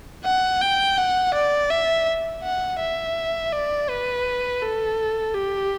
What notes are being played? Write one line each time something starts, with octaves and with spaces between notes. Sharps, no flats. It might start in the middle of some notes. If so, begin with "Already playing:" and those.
F#5
G5
F#5
D5
E5
F#5
E5
D5
B4
A4
G4